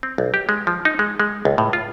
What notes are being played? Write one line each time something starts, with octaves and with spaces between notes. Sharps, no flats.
C4
B1
G4
G#3
F3
D#4
G#3
G#3
C#2
A2
F4